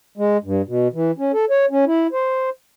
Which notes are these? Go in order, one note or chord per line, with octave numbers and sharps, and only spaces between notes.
G#3
G2
B2
E3
C#4
A4
C#5
C#4
E4
C5